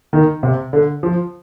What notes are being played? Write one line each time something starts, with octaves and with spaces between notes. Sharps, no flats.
D#3
C3
D3
F3